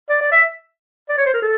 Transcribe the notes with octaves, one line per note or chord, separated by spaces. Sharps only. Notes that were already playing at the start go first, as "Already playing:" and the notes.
D5
D5
E5
D5
C#5
C5
A#4
A4